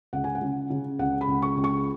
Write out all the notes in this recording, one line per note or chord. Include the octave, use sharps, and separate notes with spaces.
C#2 F#5
G#5
F#5
C#3
C#3
C#2 F#5
B5
C#2
C#6
C#2
C#6